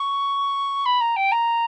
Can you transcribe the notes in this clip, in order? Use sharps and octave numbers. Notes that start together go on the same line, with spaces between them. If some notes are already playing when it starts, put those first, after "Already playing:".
Already playing: C#6
B5
A#5
G5
A#5